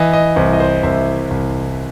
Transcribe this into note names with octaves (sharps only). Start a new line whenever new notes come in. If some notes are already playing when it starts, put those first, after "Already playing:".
Already playing: E3 D#5
D#5
C2 C5
D#5
C5
C2 C5 E5
C2